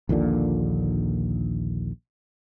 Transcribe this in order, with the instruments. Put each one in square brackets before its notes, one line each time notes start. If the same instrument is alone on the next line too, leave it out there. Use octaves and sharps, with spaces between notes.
[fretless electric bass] A#1 D#2 A#2 D3